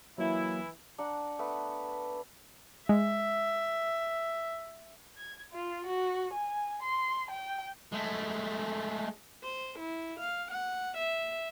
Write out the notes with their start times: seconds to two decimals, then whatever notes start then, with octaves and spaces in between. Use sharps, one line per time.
0.18 E3 F#3 A#3 E4
0.98 D4 F#5 A#5
1.39 A3 B3 B4 A5
2.89 G#3 E5
5.17 G#6
5.53 F4
5.87 F#4
6.33 G#5
6.82 C6
7.31 G5
7.92 G#3 A3
9.44 C5
9.79 E4
10.20 F5
10.51 F#5
10.98 E5